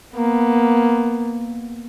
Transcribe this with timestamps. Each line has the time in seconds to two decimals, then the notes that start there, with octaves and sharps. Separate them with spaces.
0.15 A#3 B3